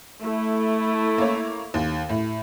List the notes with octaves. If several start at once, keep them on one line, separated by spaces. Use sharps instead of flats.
A3 E4
A#3 C#5
D#2
A2